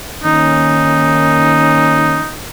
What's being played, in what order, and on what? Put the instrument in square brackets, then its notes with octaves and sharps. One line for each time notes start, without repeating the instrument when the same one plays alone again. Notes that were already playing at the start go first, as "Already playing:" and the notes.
[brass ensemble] D#3 A#3 C#4 [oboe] D#4